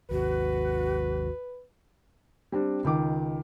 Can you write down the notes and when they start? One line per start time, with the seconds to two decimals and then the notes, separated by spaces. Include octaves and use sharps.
0.11 G#1 D#2 F#4 B4
2.52 G3 C4 D4
2.84 C#2 D#3 D6